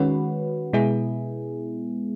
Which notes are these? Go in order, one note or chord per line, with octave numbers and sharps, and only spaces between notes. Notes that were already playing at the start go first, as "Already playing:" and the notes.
Already playing: D#3 G#3 C#4 F#4 B4
B2 G#3 B3 E4 G#4